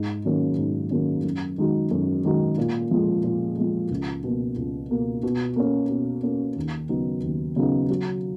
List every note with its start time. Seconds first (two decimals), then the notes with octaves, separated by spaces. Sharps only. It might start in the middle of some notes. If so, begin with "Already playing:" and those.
Already playing: G#2
0.25 D#3 F#3 A#3 C#4
0.58 G#2
0.91 D#3 F#3 A#3 C#4
1.24 F#2
1.58 D#3 G#3 D#4 F#4
1.91 F#2
2.25 D#3 G#3 D#4 F#4
2.58 A#2
2.91 F3 G#3
3.24 A#2
3.57 F3 G#3
3.91 C#2
4.24 B2 A#3
4.56 C#2
4.90 B2 A#3
5.23 B2
5.56 A#3 C#4
5.89 B2
6.23 A#3 C#4
6.56 D#2
6.89 C#3 F#3 B3 D#4
7.23 D#2
7.56 C#3 F#3 B3 D#4
7.90 F#3